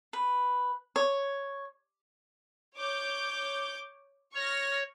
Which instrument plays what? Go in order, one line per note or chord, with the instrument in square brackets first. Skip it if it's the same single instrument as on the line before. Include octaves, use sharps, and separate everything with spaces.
[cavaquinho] B4
C#5
[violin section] C#5 D6 G6
[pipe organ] C#5 [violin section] C#6 F6 A#6